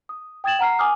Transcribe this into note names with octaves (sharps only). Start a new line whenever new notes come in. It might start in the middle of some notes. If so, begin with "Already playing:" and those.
D#6
G5 D#6 G#6 A6 E7 F#7
F#5 A#5 F6 C7
G#5 D6 D#6 F6